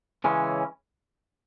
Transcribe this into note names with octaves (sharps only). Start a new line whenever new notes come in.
C#3 E3 G#3 C#4